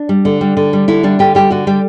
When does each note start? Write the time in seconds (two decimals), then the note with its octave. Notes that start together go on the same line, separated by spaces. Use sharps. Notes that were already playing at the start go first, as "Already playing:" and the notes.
Already playing: D4
0.09 G3
0.25 D3
0.41 G3
0.57 D3
0.73 G3
0.88 D3 E4
1.03 G3 D4
1.19 D3 G4
1.35 G3 G4
1.50 D3 F#4
1.67 G3 G4